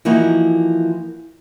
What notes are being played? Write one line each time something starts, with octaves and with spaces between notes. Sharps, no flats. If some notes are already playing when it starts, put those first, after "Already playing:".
E3 F3 A#3 D#4 E4 F#4